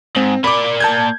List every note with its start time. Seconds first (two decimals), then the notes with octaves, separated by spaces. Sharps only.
0.16 G#2 C4
0.44 A#3 D5 B5 D6
0.80 A5 G6 G#6